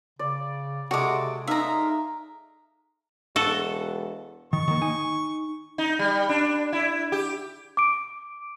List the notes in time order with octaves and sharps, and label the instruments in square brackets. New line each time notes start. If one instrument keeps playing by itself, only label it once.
[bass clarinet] C#3 [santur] D5
[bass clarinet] C3 [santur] G#3 A4 D5 [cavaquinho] F#4 D6
[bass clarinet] D#4 [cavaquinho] E5 A#5 [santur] F5
[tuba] E1 [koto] F#4 A4
[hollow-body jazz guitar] D#3 [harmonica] C#6
[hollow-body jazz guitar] D#3 A#3
D#4 G#5
[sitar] D#4
G3
D4
E4
G4
[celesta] D6 D7